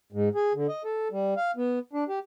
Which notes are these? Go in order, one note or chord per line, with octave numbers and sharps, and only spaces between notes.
G#2
G#4
D3
D#5
A4
G3
F5
B3
D4
G4